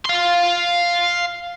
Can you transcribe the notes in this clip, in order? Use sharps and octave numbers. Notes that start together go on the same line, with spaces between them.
F5 C6